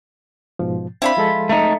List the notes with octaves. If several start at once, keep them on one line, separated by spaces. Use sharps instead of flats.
G#2 B2 F3
C4 D4 E4 F4 C5 B5
F3 G#3 A4
A3 D#4